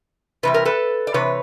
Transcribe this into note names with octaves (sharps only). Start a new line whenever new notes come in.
C3 E3 G3 B4
A#4
A4 B4
D5
C3 E3 B4 C#5